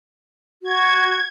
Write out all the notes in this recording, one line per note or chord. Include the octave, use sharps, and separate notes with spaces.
F#4 G#6